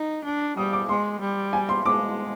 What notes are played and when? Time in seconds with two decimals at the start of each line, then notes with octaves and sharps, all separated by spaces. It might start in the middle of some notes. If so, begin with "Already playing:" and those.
Already playing: D#4
0.25 D4
0.57 G3 D#6
0.73 D6
0.89 G#3 C6
1.21 G3
1.53 G#5
1.69 C6
1.85 G#3 D6